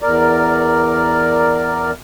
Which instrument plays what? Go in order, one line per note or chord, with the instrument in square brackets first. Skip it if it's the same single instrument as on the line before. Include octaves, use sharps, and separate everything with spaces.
[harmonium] E2 A#4 D5